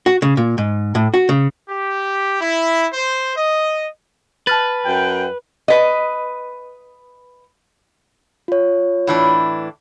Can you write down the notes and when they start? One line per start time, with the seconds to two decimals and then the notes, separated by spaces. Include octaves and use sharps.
0.06 F#4
0.22 C#3
0.37 A#2
0.58 G#2
0.95 A2
1.14 F#4
1.29 C#3
1.68 G4
2.40 E4
2.93 C5
3.35 D#5
4.47 B4 A5 F6 A6
4.84 F#2 G5
5.68 B4 D#5
8.48 F4 C#5
9.07 A2 E3 D4